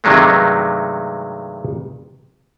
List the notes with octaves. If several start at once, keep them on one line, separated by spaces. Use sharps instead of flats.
G2 C3 D#3 F#3 G#3 A3